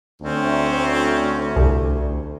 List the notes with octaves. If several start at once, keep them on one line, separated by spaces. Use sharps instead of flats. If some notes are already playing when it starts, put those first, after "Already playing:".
D2 C4 C#4
C2